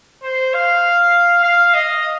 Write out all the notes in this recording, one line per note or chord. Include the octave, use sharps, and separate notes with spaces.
C5
F5
F5
D#5